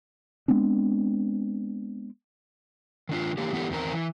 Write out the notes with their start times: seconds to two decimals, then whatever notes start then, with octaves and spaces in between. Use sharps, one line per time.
0.48 G#3 B3 C4 D4
3.09 D#3 D4 F4
3.38 D3 E3 A#3 G4
3.53 E3 B3 E4 F#4 G4 A4
3.70 E2 D#3 C4 A#4
3.93 E3